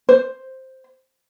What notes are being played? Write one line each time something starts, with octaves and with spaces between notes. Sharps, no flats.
C5